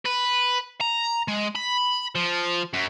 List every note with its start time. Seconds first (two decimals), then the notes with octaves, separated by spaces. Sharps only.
0.05 B4
0.81 A#5
1.28 G#3
1.55 B5
2.15 F3
2.74 F#2